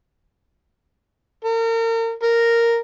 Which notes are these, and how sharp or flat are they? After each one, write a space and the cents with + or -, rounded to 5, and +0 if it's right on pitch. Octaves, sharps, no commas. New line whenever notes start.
A#4 -35
A#4 -5